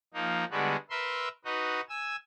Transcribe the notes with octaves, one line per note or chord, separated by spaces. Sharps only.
F3 A#3 D#4
D3 G3 G#3 B3 F#4
A#4 B4 E5 C6
D#4 F#4 B4 D#5
G#5 E6